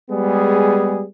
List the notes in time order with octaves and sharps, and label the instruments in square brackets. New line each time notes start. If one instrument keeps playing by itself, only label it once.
[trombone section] G3 G#3 B3 G#4